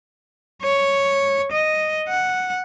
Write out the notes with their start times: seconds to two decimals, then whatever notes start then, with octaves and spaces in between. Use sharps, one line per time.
0.62 C#5
1.51 D#5
2.08 F#5